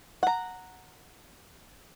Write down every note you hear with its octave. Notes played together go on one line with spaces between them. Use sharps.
F#5 A#5